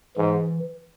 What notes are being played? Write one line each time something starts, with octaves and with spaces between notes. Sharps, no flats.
G#2 E3